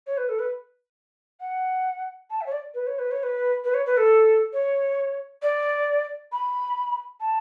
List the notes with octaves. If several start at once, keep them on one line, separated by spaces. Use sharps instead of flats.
C#5
B4
A4
B4
F#5
A5
E5
C#5
D5
B4
C#5
B4
C#5
B4
B4
C#5
B4
A4
C#5
D5
B5
A5